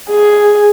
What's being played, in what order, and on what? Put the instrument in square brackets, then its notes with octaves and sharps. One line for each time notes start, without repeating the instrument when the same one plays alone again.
[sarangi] G#4